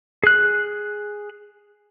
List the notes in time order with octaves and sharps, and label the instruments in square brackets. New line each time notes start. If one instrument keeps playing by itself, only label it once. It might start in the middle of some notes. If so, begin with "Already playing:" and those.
[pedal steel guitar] G#4 F#6